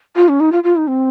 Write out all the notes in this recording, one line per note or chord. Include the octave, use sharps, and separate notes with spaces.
F4
C#4
D#4
F4
F4
D#4
C4